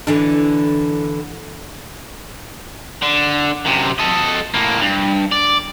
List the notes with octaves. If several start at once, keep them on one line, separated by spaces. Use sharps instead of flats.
D3 E3 D4
D3
F#2 C3
A4 D#5
A2 A#3
G2
D5